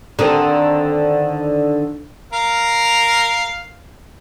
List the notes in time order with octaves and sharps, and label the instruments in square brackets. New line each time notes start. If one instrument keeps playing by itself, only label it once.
[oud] D3 D#3 C4
[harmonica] A#4 F5